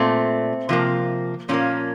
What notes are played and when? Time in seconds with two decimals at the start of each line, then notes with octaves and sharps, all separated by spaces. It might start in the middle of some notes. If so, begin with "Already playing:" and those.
Already playing: A#2 A3 C4
0.69 C3 F3 A#3
1.49 A#2 F3 A#3 C#4